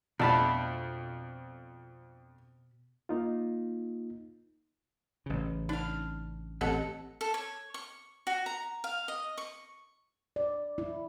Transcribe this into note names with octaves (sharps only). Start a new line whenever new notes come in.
F2 B2 A3 D4 A5 B5
A#3 D#4 F4
A1 C#3
D4 D#4 F5
A1 C4 G4 A4 D#5 F#5
A4
C#5
C#6
F#4
A#5
F5
D#5
C#6
D5
E4